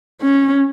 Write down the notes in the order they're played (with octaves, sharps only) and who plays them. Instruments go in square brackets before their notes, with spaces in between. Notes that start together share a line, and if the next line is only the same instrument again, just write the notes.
[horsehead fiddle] C#4